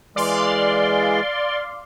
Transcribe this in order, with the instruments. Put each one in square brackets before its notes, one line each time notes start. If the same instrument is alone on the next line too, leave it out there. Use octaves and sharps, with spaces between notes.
[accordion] E3 G#3 [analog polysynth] D5 F5 C6